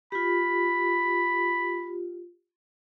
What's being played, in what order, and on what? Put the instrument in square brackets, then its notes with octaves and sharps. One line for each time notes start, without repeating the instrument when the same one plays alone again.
[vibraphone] F4 G4 [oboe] B5